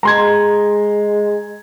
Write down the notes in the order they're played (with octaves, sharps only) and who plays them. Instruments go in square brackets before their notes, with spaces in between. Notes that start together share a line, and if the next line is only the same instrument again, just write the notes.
[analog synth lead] G#3 [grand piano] A#5 C6 G#6